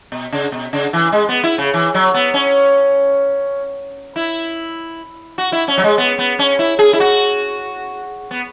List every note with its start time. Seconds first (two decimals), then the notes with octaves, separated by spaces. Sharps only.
0.12 B2
0.32 C#3
0.52 B2
0.73 C#3
0.93 E3
1.12 G#3
1.29 B3
1.44 E4
1.58 C#3
1.74 E3
1.94 F#3
2.14 B3
2.34 C#4
4.16 E4
5.38 F#4
5.52 E4
5.68 C#4
5.78 F#3
5.84 G#3
5.98 B3
6.18 B3
6.39 C#4
6.59 E4
6.79 G#4
6.93 E4
7.00 F#4
8.31 B3